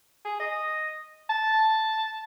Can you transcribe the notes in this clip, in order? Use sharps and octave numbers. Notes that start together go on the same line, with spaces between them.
G#4
D#5
A5